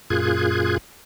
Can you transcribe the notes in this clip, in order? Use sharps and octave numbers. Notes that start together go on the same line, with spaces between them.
F#2 A#2 F4 G#4 F#6 G#6